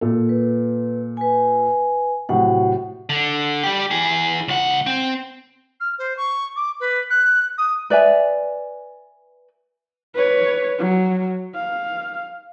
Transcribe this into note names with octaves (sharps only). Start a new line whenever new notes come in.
A#2 A4
B4
B4 G#5
A2 C3 F#3 F#4 F#5
D3
G3 G4
E3 G#4
C#2 F#5
C4
F6
C5
C#6
D6
B4
F#6
D#6
B4 D5 E5 G#5
B4 C#5
F#3
F5